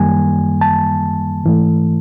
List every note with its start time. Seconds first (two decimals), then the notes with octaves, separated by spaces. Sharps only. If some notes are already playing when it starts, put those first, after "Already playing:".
Already playing: F#2 D#3 G3 A#3 G#5
0.61 A5
1.44 G#2 E3 A3